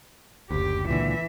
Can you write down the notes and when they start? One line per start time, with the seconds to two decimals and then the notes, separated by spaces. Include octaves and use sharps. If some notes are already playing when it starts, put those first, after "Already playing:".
0.51 F#1 D2 G4 G5
0.89 C#2 A#2 D3 E3 E5